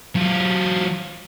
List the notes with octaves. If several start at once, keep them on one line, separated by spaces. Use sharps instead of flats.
F#3 F4